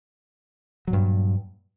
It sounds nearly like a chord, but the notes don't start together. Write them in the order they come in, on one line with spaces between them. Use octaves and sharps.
F#3 A#2 G2